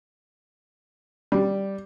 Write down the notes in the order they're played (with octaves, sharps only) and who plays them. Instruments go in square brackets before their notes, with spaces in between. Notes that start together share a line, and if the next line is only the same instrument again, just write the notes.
[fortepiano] G3